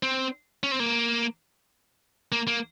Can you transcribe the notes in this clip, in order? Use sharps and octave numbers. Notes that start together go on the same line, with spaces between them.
C4
C#4
C4
A#3
A#3
A#3